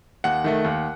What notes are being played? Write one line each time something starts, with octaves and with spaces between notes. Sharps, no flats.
D#2 F#5
D#3 A3
D#2